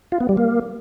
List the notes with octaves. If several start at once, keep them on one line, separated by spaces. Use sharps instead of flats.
F4
B3
G3
A#3